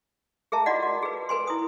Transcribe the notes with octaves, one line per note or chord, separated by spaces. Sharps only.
G#4 A#4 E5 A5 A#5
F4 F#4 D5 D#5 F#5
F#4
G#4 B4
A#4 B4 G#5 C6
E4 D#6